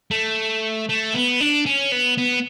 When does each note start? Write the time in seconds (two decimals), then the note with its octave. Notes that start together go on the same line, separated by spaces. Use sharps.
0.11 A3
0.89 A3
1.14 B3
1.40 D4
1.66 C#4
1.92 B3
2.18 B3